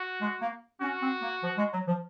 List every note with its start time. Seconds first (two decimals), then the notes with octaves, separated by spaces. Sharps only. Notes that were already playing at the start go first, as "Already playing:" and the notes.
Already playing: F#4
0.20 G#3
0.40 A#3
0.81 C#4 F#4
1.01 C4
1.21 A#3
1.41 F3
1.57 G#3
1.72 F#3
1.87 F3